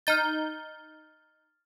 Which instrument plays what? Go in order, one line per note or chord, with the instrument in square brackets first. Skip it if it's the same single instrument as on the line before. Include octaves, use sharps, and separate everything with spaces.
[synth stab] D#4 G6 [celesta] F6 A6